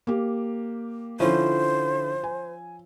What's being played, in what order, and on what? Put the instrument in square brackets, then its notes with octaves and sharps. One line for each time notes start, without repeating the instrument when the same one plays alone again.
[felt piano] A#3 G4
[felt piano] D3 E4 [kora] F3 C#4 [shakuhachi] C5
[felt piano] G#5